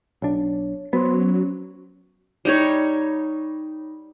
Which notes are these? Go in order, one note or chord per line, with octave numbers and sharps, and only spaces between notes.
B1 D4 C#5
F#3 B3 C5 C6
C#4
G3 D#4 C#5